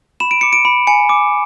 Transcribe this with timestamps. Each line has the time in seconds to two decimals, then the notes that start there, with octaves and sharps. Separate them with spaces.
0.20 B5 E7
0.31 D7
0.41 D6 C#7
0.53 D7
0.65 B5
0.87 G#5 C#7
1.09 D6